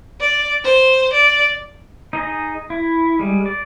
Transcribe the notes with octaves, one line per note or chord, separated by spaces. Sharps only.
D5
C5
D5
D#4 G#4 D#5
E4
G3 G#3
D5